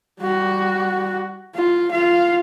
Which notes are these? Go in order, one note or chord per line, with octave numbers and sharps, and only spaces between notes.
G3 F#4
F4
F4 F5